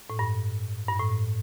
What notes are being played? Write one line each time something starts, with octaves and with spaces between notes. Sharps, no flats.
A2
G2
G2
A2